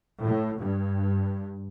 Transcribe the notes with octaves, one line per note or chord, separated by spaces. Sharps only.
A2
G2